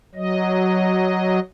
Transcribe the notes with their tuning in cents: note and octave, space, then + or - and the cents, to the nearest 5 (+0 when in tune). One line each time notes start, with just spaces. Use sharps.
F#3 +0 D#5 +0